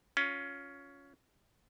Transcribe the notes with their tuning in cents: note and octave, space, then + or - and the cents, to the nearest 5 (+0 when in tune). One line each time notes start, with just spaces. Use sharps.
C#4 +15 F4 +25